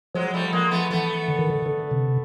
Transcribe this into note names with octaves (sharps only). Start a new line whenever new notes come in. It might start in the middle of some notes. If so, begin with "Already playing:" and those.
F3 F#3 G#3
G3 A3
G#3 A#3
A3 B3
E3 A3 B3
D3
D#3
D3
D3
C3